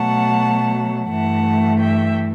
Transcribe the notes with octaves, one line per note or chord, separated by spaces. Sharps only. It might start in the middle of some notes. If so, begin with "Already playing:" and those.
Already playing: B2 F#3 A3 F#5 A5
G2 E3 A3 F#5 A5
E5 G5